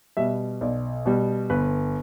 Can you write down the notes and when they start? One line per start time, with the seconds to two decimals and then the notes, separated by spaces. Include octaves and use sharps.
0.17 B2 G3 E5
0.61 B1 D5
1.06 B2 G3
1.50 G1 B4